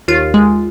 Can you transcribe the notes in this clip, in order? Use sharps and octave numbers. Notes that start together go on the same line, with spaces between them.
D#2 F4
G#3